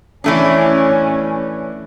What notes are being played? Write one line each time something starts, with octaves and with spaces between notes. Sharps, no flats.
E3 A3 C#4 D4